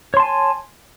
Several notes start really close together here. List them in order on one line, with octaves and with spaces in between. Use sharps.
C#5 C6 A5 G#5